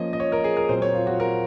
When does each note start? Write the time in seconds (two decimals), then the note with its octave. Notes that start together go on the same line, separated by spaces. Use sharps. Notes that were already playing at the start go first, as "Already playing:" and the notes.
Already playing: F3 A#3 C#4 D#5
0.13 D#5
0.20 C#5
0.32 A#4
0.44 G#4
0.57 A#4
0.69 A#2 F#3 C4 C5
0.82 C#5
0.95 F4
1.07 F#4
1.20 A#4